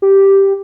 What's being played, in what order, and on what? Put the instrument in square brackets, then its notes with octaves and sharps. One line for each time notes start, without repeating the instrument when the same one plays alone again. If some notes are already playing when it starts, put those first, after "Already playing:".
[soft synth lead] G4